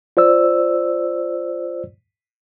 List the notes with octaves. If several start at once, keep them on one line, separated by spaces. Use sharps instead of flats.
F4 C5 D5 E6